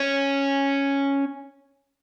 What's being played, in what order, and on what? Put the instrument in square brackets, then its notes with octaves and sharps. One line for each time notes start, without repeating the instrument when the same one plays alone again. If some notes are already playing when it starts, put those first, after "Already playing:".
Already playing: [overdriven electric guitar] C#4